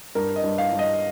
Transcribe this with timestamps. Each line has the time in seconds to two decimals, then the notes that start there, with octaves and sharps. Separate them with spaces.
0.15 G2 A#4
0.36 D#5
0.43 G2
0.58 F5
0.72 G2
0.79 D#5